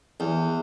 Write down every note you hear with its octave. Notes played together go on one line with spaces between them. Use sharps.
E2